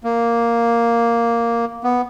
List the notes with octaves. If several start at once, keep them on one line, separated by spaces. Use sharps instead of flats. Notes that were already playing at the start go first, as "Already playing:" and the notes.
A#3
B3